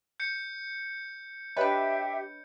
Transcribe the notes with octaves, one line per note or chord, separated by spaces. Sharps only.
G6 C#7
D4 G4 B4 C#5 D#5 E5 G5